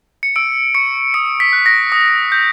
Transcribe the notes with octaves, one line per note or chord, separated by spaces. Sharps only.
C#7
E6 D7
C#6 C#7
D#6 C#7
B6
F#6
A#6
D#6
G6